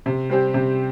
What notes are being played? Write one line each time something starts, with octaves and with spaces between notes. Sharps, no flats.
C3
G3 C4 G4
C3